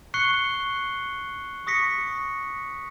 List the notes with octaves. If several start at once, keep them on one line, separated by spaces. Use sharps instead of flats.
C#6 F#6 C7 C#7 G7
C#6 D#6 A#6 B6 C#7